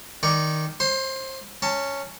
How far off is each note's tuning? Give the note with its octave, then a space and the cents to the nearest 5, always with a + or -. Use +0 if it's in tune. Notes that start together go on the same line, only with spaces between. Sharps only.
D#3 +0 D5 +0 C#6 +0
C5 +25 C6 +0
C#4 +0 A5 +30